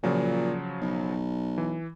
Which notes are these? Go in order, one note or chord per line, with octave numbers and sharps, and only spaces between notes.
A#2 C#3 F3 F#3
B1
E3